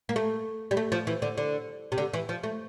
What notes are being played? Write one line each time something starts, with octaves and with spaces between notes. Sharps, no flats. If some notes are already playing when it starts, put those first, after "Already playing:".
A#3
A3
G3
A3
F3
E3
D3
D3
C3
D3
E3
F3
A3